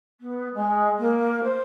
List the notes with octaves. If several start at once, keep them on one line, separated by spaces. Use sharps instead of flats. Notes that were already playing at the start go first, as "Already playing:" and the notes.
B3
G#3
A#3
C5